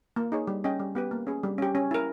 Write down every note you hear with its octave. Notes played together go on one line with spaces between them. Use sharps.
A#3
D#4 G#4 C#5
G3
C#4 G#4 D#5 G5
G3
B3 G4 B4
A#3
C#4 G#4
G3
C#4 G4
C#4
E4 A#4